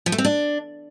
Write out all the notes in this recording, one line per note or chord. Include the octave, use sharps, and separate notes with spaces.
F3
A3
C4
D4